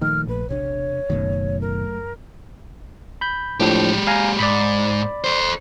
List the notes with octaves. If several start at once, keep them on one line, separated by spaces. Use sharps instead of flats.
A#2 D#3 F3 A3 F6
A#1 B4
E1 C3 D4 C#5
F#1 F#2 B2 D#3 F#3 A3
A#4
B5 G6
A2 F3 G#3 D4 G4
F5 G#5 A#5
G#2 D5 B5
A4 C5